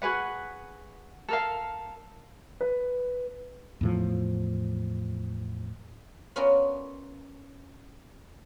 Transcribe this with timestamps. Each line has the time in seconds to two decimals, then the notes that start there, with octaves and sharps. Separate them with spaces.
0.02 F#4 G#4 B4 F#5
1.29 A4 A#4 F5
2.61 B4
3.81 E2 A2 F3
6.36 B3 C#4 F4 F#4 A#4 D5